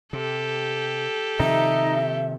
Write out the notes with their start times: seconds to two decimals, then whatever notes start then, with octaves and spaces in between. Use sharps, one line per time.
0.13 C3 G4 A4
1.40 C3 D#3 F3 D#4 E5